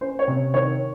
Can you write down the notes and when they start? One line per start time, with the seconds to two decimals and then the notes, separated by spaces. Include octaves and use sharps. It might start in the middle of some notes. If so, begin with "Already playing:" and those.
0.01 C#4 C5
0.19 C#5
0.27 C3
0.54 D#3 C#5